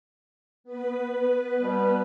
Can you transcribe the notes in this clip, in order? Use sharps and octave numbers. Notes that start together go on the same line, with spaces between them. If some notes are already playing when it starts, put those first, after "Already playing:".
B3 B4
B2 G3